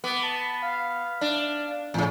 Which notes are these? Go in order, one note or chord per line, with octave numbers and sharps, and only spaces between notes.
B3 D6
A5
F5
D4
E2 A2 C#3